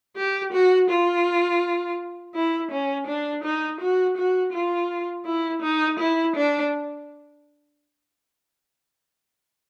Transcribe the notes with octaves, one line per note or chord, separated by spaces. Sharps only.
G4
F#4
F4
E4
C#4
D4
D#4
F#4
F#4
F4
E4
D#4
E4
D4